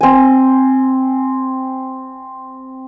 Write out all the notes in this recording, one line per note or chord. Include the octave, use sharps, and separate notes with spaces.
C4 G#5